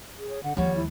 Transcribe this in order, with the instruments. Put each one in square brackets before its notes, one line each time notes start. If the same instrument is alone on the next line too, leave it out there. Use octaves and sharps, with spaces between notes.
[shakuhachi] G#4
[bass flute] C#5
[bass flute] D3 [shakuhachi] F#5
[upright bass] D#2 [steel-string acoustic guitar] F3 G3 [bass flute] C#5 [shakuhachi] F#5
[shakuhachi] E4